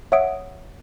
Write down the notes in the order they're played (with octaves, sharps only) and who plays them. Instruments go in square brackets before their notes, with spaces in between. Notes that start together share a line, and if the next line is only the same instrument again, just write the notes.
[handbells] C#5 E5 F#5 D#6 D7